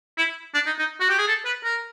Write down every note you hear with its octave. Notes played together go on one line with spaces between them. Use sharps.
E4
D4
D#4
D#4
F#4
G4
G#4
A4
B4
A#4